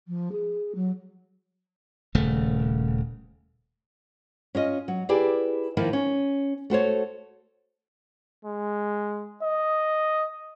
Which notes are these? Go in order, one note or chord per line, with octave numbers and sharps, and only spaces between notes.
F3
G#4
F#3
D#1 C#3 A3
C#4 F4 D#5
F#3
E4 G4 G#4 B4 D5
D#3 F3 A#3 E4 F4
C#4
A3 F#4 C5 C#5
G#3
D#5